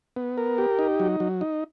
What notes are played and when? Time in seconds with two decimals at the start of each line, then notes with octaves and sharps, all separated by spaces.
0.16 B3
0.38 A#4
0.58 G4
0.79 D#4
1.00 F#3
1.20 F#3
1.41 D#4